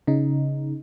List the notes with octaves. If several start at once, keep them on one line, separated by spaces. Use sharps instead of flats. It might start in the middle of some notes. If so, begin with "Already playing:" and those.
C#3 D#4